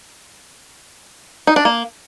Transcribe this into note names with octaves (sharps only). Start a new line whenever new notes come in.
D#4
D4
A#3